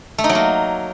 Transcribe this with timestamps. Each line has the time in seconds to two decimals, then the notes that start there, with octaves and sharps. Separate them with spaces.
0.18 A3
0.24 D#4
0.29 F#3
0.35 A#3